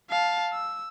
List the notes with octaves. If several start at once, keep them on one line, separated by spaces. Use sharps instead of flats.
F5 A5
E6